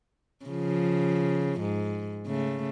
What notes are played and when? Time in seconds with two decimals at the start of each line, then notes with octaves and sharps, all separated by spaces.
0.46 C#3 F3
1.61 G#2
2.27 C#3 A3